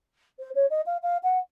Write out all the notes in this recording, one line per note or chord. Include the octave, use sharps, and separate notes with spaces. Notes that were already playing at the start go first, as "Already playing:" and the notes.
C5
C#5
D#5
F5
F5
F#5